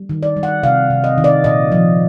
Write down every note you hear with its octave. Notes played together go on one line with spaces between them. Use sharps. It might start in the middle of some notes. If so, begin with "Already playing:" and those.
Already playing: G3
D#3
D5
G3
F#5
C3 F5
C3
D#5
D#3
D5
A#2 D#5
F3